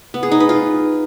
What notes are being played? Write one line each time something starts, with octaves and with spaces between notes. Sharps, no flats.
B3
G#4
D#4
B4
F4